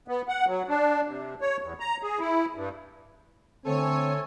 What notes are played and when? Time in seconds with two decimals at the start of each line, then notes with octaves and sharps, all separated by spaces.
0.08 B3
0.28 F#5
0.46 F#3
0.68 D4
1.07 C3
1.41 C#5
1.62 E2
1.80 A#5
2.02 G#4
2.19 E4
2.55 G2
3.66 D3 A3 C4 A4 C#5 G#5